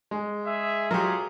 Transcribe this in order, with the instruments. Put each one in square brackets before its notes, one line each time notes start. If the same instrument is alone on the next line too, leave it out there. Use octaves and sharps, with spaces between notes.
[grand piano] G#3
[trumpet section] G#4 E5
[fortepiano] F#3 G4 [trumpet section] F4 G#4 [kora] A#4 C#5